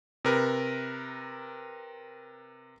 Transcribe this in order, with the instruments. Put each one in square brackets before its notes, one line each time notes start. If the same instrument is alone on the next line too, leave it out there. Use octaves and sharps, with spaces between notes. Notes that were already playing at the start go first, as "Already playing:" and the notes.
[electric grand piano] C3 A#4 B4